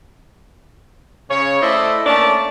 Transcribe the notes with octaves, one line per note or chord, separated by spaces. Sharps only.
C#3 C#5
A3 E4 A4 C5 D5 D#5
A3 A#3 C#4 D5 A5